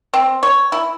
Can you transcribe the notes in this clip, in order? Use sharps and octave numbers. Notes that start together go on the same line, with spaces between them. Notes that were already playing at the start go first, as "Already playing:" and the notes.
C4
C#5
E4